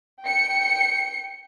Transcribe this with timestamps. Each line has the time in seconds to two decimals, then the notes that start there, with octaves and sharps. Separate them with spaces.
0.23 G5 C#7